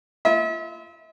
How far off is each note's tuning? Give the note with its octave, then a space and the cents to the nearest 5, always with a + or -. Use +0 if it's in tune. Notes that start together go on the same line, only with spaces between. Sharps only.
F4 -30 E5 -40